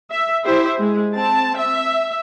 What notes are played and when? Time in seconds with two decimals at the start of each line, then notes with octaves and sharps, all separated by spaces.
0.11 E5
0.44 E4 G4 C5 E5
0.79 G#3
1.13 C4 A5
1.57 E5